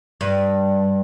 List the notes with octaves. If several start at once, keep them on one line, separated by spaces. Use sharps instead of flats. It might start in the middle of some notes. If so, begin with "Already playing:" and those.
G2